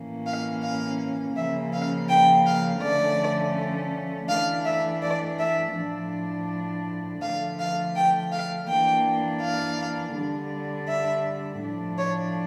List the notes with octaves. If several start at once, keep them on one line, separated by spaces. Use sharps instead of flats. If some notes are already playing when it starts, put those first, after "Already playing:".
Already playing: A2 E3 A#3 C#4
F5
F5
C#3 F3 A#3 C#4 E5
F5
G5
F5
D3 F3 A3 C#4 D5
E3 A3 D4 F5
E5
D5
E5
A2 F3 A3 D4
D3 F3 A3 F5
F5
G5
F5
E3 A#3 D4 G5
F5
D3 G3 D4
E5
A2 F3 A3 D4
C#5